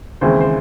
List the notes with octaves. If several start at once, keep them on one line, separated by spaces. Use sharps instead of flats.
D#2 C#3 E3 G#3 C4 C5
C5